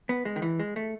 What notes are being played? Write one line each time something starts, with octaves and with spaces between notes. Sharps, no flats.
B3
G#3
D#3
E3
G#3
A3